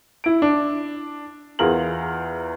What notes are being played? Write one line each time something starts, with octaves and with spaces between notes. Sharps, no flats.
E4 D7
D4
E2 F4 G#4 A#4 F#7